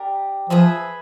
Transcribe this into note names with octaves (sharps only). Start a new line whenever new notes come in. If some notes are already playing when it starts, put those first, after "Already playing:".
Already playing: D4 G4 A#4
F3 G#4 B4 E5